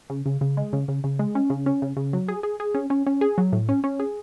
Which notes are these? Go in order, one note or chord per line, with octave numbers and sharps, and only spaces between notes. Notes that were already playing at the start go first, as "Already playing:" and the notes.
C#3
C#3
C#3
G#3
C#3
C#3
C#3
G#3
C#4
C#3
C#4
C#3
C#3
F#3
G#4
G#4
G#4
C#4
C#4
C#4
G#4
F#3
A2
C#4
C#4
G#4